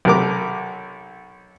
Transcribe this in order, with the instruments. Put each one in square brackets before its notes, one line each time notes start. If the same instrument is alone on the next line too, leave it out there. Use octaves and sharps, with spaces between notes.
[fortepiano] B1 C3 A#4 D6